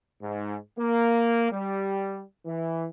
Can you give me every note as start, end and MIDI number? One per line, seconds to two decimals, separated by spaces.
0.21 0.57 44
0.78 1.48 58
1.51 2.22 55
2.46 2.86 52